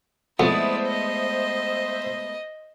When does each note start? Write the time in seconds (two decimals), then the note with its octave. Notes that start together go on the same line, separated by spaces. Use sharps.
0.40 F2 G#3 A3 B3 E4 C5 D5 E5
0.87 D#5